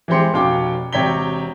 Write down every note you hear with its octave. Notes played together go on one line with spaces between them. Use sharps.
E3 G#3 C4 G4 C6 C#7
F1 B2 C#4 F5 G5 D6
E1 C3 C#5 G5 B6 G7